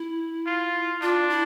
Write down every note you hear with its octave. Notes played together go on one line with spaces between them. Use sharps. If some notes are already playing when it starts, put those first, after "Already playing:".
Already playing: E4
F4
D4 F4
E4